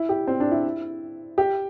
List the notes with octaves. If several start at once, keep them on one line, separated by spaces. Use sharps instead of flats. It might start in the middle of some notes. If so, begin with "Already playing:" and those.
Already playing: E4
G4
C4
D4
E4
G4